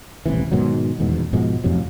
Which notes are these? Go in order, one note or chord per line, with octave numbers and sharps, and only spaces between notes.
D#1 A1 C3 E3
G#2 B2 D#3 F#3
D#1 E2 G#2 B2
G#2 B2 F3 G#3
F2 A2 C3 F#3